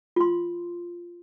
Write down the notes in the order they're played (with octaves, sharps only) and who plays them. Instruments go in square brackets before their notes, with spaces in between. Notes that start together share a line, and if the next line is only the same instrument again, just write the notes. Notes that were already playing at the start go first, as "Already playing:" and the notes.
[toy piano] F4 C6